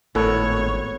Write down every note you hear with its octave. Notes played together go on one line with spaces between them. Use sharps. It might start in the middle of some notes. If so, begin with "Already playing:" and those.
G#1 A2 B3 A4 A#4 C#5